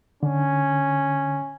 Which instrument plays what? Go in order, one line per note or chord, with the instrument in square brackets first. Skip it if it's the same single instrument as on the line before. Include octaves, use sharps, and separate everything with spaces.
[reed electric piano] D3 [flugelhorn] C#4